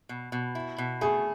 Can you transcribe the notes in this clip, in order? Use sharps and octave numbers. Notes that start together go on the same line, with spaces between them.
B2
B2
E4
B2
A3 G#4